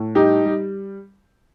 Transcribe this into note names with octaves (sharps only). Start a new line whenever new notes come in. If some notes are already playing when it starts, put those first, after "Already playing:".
Already playing: A2
G3 D#4 G4
G3